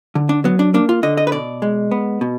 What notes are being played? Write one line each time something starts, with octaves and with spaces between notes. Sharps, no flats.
D3
D4
F#3 B3
D4
A#3 D4
F4
D3 D#5
D#5
B4
B2 D5
G#3
B3
B2